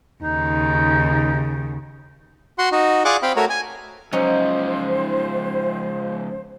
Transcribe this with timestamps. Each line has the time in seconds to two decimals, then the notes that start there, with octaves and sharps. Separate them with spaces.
0.24 D#2 C#3 D#4
2.58 F#4 F#5 C6
2.72 D#4 F#4
3.05 F4 G#4 D5 F#5 C#6 D6
3.23 C4 F5 G5 B5
3.36 A3 F#4 A#4 C#5
3.50 G#5
4.13 C#2 F3 F#3 C#4 D#4 C5